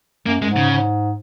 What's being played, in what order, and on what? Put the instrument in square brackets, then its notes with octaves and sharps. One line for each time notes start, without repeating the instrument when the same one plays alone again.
[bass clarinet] F#2 [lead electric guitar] A#3
[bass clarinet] F#2 [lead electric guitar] G#3
[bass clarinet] G#2
[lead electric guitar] C#3
[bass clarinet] G#2